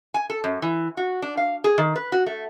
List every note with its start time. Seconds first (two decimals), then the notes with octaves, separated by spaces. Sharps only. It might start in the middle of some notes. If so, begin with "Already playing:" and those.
0.14 G#5
0.30 A4
0.44 F#2
0.62 E3
0.97 F#4
1.22 D4
1.37 F5
1.64 G#4
1.78 D#3
1.96 B4
2.12 F#4
2.26 A3